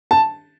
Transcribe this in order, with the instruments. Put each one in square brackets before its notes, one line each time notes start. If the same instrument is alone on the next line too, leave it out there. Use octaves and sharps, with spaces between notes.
[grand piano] A5